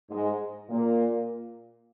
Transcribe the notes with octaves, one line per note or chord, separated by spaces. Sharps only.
G#2 G#3
A#2 A#3